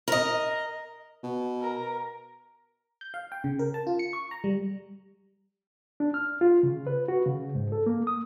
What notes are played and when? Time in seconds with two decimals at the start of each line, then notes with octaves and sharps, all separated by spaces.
0.08 A#4 D#5
1.23 B2
1.61 A#4
3.01 G6
3.14 F5
3.32 G5
3.44 C#3
3.59 A#4
3.74 A5
3.87 F4
3.99 C#7
4.13 C#6
4.31 A#5
4.44 G3
6.00 D4
6.14 F6
6.41 F4
6.63 C#3
6.87 B4
7.08 F#4
7.26 C#3
7.55 G#2
7.72 A4
7.86 A#3
8.07 D#6